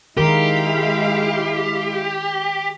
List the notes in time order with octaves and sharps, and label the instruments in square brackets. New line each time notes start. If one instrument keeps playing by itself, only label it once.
[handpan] D#3 A#4 [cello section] G#3 E4 F5 [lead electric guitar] G4